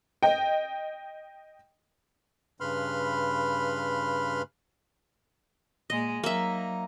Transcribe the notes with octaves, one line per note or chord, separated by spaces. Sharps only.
D#5 G5
G2 C#3 B4 B5 C6 F6
A#2 G#3 D#5
F#3 A#3 D#4 E5